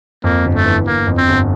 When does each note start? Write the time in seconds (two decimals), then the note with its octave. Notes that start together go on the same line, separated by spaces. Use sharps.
0.24 F2 A#3
0.44 G1
0.55 A3
0.65 E3
0.87 G1 A#3
1.07 F2
1.18 C4
1.28 G1